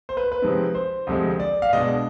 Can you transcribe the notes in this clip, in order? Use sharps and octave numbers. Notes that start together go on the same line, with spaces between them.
C5
B4
B4
C3 F3 G#3 C4 D#4
C5
D2 C3 F3 G#3
D5
F5
B2 G#3 D4 D#5